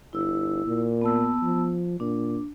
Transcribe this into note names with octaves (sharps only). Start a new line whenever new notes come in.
G1 E4 E6
A#2
B3 A5 E6
F3
A#2 D4